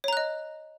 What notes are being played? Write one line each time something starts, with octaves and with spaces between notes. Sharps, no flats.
C#5 D#5 A#5 F#6